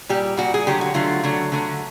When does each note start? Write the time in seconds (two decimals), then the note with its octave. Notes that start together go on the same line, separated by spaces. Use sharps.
0.09 A#2 G3 G4
0.37 A#2 G3 F#4
0.54 G#4
0.67 D3 F#3 A3 G4
0.81 F#4
0.94 D3 F#3 A3 F4
1.23 D3 F#3 A3
1.52 D3 F#3 A3